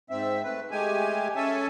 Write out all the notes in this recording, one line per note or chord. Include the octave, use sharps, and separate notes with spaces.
G#2 C4 E5
A3 B4
G#3 A3 G4 G#5
C#4 A4 C#5 E5 G#5 A5